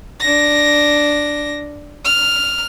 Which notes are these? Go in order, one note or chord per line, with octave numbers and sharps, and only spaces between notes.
D4 A#6
F6